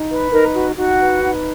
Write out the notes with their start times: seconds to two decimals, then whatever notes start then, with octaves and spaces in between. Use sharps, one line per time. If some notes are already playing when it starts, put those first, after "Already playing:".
Already playing: D#4
0.10 B4
0.31 D#4 A#4 A#5
0.54 F#4
0.76 D#4 F#4 F#5
0.99 B4
1.22 D#4